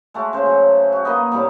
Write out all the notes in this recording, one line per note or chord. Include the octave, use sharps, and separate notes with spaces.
G#3 A3 F#4
C#3 C5
F#3
F#4
A#3 D#4 B4 D#5
A2 C3 G3 A#3